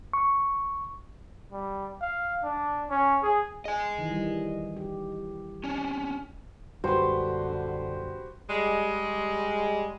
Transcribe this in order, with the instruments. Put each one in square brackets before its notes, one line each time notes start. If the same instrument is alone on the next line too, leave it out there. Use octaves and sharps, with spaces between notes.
[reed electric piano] C#6
[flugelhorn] G3
F5
D4
C#4
G#4
[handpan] G#4 [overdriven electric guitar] D#5 G#5
[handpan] D#3 E3
G3
G4
[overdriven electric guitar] C#4 D4
[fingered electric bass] A#1 F#2 G3 [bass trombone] D3 [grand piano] F#4 G4 B4 [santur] C5
[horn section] G3 G#3